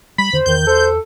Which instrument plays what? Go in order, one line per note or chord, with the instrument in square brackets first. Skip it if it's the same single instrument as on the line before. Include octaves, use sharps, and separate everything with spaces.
[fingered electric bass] G3 [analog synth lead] B5
[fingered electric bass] E2 D3 D#3 [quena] C5
[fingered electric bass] E2 [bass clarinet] D#3 [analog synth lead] G6
[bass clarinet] A4 [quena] C5